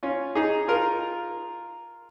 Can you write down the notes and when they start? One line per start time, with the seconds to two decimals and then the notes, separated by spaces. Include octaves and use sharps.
0.03 C#4 F4
0.35 D#4 G#4
0.68 F4 A#4